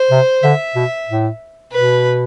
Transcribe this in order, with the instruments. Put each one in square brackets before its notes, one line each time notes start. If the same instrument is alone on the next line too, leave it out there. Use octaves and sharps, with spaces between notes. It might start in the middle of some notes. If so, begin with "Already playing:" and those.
Already playing: [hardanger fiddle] C5
[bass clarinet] C3
[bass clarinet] D3 [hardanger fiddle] E5
[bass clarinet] B2
A2
[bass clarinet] B2 [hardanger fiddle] B4